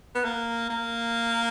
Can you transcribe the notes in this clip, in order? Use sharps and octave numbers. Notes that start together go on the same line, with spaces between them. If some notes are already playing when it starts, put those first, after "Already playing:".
B3
A#3
A#3